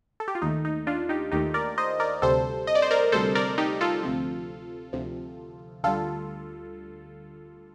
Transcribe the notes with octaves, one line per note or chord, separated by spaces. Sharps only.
A4
G4
F4
D#2 D#3 A3 D#4
D#4
D4 F4
D#4 G4
D#2 D#3 A3 D#4 G4
A#4 D5
C5 D#5
A#4 D5
D2 C3 G3 A4 C5
D#5
D5
C5
A#4 D5
D2 C3 G3 A4 C5
A#4 D5
D#4 G4
F4 A4
D2 C3 F3
D2 C3 F3
D2 D3 G3 F4 A4